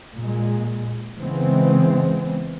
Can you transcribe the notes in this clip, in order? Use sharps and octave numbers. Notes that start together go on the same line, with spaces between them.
A#2 G#3
C#3 E3 G#3 B3 C4